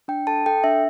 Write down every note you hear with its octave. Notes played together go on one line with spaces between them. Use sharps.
D4 G5
A4 A5
A4 G5
D4 E5